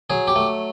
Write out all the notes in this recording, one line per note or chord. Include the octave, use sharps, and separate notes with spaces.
F#3 G#4
G4
A3